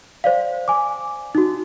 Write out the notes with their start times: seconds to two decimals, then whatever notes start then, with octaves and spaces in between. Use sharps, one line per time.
0.24 C5 D5 F5
0.68 G#5 D6
1.35 D#4 F#4